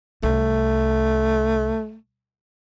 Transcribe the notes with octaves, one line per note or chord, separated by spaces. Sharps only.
C2 A3